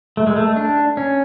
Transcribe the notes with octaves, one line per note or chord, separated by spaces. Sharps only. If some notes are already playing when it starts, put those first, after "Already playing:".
A3
G#3
A3
D4
C#4